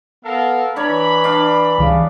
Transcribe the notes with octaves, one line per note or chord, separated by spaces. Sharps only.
B3 A4 A#4 F5
E3 D4 A#4 C#5 B5
D4 F5
C#2 C#3 E3 G3